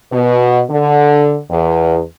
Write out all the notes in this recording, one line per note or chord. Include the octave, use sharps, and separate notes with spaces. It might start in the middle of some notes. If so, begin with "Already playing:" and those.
B2
D3
E2